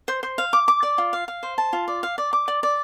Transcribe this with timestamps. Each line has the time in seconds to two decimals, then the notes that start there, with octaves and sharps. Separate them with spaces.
0.08 C5
0.23 C5
0.38 F5
0.53 D6
0.68 D6
0.83 D5
0.98 F4
1.13 F5
1.28 F5
1.43 C5
1.58 A5
1.73 F4
1.88 D5
2.03 F5
2.18 D5
2.33 D6
2.48 D5
2.63 D5